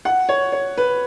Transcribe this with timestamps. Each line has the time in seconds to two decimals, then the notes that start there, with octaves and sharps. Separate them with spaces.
0.05 F#5
0.29 C#5
0.52 C#5
0.78 B4